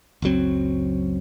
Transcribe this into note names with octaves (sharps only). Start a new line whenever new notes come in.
F#1 C#2 F#3 C4